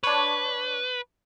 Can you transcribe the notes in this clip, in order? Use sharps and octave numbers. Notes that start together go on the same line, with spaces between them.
D4 B4 C#5